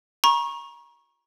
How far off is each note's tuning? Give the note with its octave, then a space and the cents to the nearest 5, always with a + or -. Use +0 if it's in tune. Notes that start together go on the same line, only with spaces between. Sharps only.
A#5 +35 C#6 -20